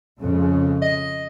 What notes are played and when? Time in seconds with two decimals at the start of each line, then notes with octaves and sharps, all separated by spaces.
0.21 F2 C#3 G#3
0.82 D#5